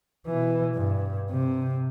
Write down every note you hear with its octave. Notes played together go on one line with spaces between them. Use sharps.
B2 E3
G2
C3